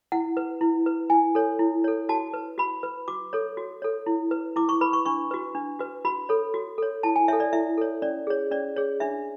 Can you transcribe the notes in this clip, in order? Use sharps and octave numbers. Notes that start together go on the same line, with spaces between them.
E4 F#5
B4
E4
B4
E4 G#5
A4 C#5
E4
A4 C#5
F#4 A5
B4
F#4 B5
B4
F#4 D6
A4 C#5
F#4
A4 C#5
E4
B4
E4 D6
C#6
B4 B5
C#6
D4 C#6
F#4 B4
D4
F#4 B4
F#4 B5
A4 C#5
F#4
A4 C#5
E4 A5
G#5
A4 C#5 E5
D5
E4 E5
A4 C#5
C#4 D5
G#4 C#5
C#4 D5
G#4 C#5
D4 E5